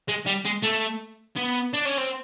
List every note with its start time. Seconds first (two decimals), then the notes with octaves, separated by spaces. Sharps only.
0.08 G#3
0.26 G3
0.45 G#3
0.63 A3
1.36 B3
1.73 D4
1.85 C#4
1.97 C4